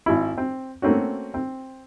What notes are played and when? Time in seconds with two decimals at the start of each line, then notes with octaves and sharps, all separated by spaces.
0.06 G#1 E4
0.38 C4
0.82 A3 A#3 C4 C#4 F#4
1.34 C4